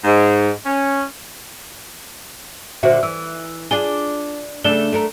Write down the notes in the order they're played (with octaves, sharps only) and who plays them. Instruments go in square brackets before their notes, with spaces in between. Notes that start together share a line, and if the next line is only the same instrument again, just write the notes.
[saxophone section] G#2
C#4
[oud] A#2 D3 F#4 [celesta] C5 E5
[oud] E3 [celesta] E6
[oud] D4 F4 G#4 [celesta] G7
[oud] C#3 A3 D4 [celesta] E7 G7
[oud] A3 D4 A#4